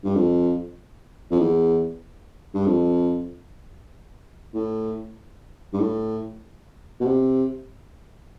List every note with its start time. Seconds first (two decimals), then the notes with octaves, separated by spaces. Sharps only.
0.05 G2
0.15 F2
1.31 F2
1.40 E2
2.54 G2
2.66 F2
4.54 A2
5.73 G2
5.80 A2
7.01 B2
7.05 C3